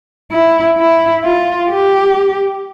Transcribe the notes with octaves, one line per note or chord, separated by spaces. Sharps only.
E4
E4
F4
G4